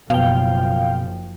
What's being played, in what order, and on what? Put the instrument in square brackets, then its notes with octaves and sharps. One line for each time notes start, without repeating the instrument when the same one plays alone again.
[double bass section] F#1 F#2 F3 [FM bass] B2 [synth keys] F5 G5